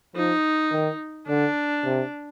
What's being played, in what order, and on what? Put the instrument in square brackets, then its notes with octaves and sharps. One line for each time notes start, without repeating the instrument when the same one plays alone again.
[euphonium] F3 [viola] D#4
[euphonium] D#3
[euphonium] D3 [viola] D4
[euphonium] C3